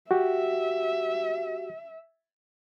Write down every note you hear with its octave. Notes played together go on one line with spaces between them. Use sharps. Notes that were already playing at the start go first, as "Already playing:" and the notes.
F#4 G4 E5